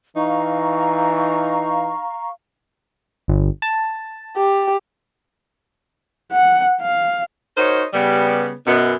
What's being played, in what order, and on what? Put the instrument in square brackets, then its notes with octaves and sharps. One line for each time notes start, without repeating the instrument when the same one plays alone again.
[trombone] E3 [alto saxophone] D#4 [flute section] F5 A#5 C#6
[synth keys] G1
A5
[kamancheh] G4
[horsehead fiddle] F#5
F5
[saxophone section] D#4 F#4 A#4 C5 C#5 D#5
C#3 G3 B3
F#2 B2 B3